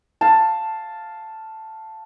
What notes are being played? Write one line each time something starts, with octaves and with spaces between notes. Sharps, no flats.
F5 A5